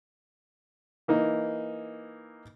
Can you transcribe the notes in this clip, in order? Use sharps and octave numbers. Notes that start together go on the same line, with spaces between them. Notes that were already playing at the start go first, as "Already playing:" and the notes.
E3 A#3 D#4